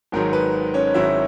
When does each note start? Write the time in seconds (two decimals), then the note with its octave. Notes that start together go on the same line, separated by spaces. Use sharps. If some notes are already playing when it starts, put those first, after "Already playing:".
0.12 G#1 G#2 D#3 F#3 A#4
0.33 B4
0.74 C#4 C#5
0.94 G#1 G#2 D#3 F#3 E4 E5